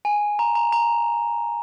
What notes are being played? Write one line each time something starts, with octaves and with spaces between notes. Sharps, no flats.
G#5
A#5
A#5
A#5